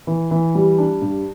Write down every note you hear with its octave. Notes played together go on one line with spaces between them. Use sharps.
E3
E3
G3
D4
G2